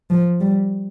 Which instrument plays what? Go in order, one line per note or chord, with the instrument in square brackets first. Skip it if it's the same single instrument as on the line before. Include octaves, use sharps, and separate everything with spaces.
[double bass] F3
G3